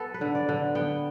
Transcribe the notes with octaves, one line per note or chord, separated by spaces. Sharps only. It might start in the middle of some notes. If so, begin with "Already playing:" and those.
Already playing: B3 A4
B4
D3
D5
D3
B3 G5